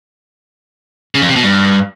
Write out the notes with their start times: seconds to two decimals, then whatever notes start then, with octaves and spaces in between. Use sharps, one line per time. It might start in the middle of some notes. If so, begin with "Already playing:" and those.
1.15 C#3
1.22 F2
1.29 C3
1.36 B2
1.43 G2